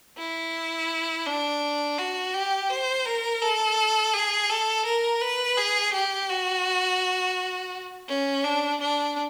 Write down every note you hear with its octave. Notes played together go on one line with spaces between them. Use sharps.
E4
D4
F#4
G4
C5
A#4
A4
G#4
A4
A#4
B4
G#4
G4
F#4
C#4
D4
D4